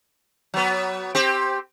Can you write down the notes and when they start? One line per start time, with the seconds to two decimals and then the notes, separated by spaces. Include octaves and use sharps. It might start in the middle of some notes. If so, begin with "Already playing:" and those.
0.54 F#3 B3
1.15 C4 G4